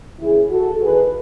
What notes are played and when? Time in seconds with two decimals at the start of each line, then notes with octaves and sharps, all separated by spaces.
0.19 D#2 C#3 E3 E4 G#4
0.49 F#4 A4
0.80 E2 D#3 G#4 B4